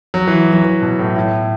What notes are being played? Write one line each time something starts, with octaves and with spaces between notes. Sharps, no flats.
F#3
E3
F#3
E3
B2
A2
A2